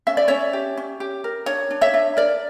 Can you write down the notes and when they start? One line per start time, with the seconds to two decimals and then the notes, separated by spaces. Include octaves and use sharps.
0.07 C#4 E5
0.17 D5
0.28 C#4 C#5 E5
0.53 G4
0.77 C#4
1.00 G4
1.24 A#4
1.46 D4 C#5
1.70 D4
1.81 C#5 E5
1.94 D4
2.17 A#4 D5